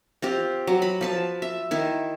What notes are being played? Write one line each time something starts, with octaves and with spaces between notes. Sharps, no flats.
C4 F4 G4
F#3
B5
F3 B4 A5
E5
D#3 E4